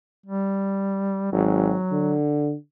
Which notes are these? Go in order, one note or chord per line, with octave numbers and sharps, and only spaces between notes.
G3
G#1 F#3
D3